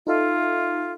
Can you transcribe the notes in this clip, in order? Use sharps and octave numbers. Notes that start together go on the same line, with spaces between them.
D#4 F4 A4 E5